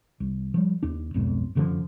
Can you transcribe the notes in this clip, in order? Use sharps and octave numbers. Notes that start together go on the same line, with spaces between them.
C2
F3 G3
D#2 D4
B1 F2 G#2
F1 F#2 D3 F3